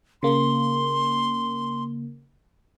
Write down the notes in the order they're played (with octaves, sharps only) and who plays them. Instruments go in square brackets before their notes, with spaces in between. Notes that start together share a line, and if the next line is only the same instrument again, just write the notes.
[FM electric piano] C#3 A#3 [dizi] C6